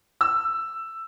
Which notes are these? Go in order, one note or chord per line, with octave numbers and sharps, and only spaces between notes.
E6